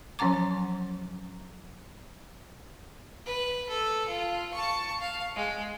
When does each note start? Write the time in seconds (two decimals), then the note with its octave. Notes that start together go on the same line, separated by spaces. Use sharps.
0.19 F3 F#3 C#4 F#5 A#5 D6
3.26 B4
3.69 A4
4.08 F4
4.54 A5 C#6
5.00 F5
5.36 G#3